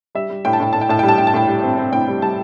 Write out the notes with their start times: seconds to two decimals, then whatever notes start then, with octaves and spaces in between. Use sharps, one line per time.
0.15 G3 E5
0.30 G3
0.45 A2 G5
0.53 A5
0.60 A2 G5
0.73 A2 A5
0.81 G5
0.89 A2 A5
0.99 G3 G5
1.08 A5
1.18 A2 G5
1.27 A5
1.34 A2 G5
1.47 G3
1.63 C4
1.77 C4
1.92 A2 G5
2.08 G3
2.22 G3 A5